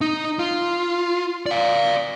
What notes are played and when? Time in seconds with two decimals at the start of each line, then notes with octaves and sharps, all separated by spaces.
0.01 D#4
0.39 F4
1.46 D5 F5